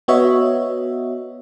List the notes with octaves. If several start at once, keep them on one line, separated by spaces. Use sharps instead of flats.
B3 F#4 C#5 D#5 E5